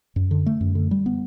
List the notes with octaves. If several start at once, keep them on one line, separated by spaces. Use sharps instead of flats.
F#2
D3
A3
F#2
D3
G3
B3